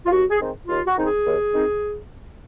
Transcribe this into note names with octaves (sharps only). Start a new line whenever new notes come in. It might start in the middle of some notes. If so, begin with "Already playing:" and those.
F4
D#2 F#4
G#4
D#3 G#3 C4 D#4
D#2 F4
F#4
D#3 G#3 C4 D#4
G#4
D#2
D#3 G#3 C4 D#4